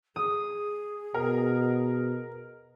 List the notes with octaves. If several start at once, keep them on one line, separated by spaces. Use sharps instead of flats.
G#4 D#6
B2 A#4